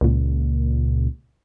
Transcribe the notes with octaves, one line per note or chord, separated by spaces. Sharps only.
C#2 A#2